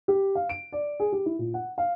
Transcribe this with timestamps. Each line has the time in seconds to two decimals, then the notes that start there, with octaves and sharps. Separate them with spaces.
0.08 G4
0.35 F5
0.49 D7
0.72 D5
1.00 G#4
1.12 G4
1.26 E4
1.39 A#2
1.54 F#5
1.78 F5